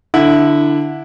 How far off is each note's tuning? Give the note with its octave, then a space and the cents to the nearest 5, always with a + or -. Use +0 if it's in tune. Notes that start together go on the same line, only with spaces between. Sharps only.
D3 +0 E4 +0